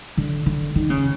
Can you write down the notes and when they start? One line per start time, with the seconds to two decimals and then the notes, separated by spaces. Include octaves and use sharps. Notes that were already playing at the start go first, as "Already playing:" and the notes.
0.17 D3
0.46 D3
0.75 D#3
0.90 C#3